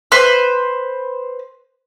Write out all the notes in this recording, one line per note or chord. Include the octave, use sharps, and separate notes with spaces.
B4 C5